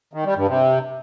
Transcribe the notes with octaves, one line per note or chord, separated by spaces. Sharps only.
D#3
G3
G2
C3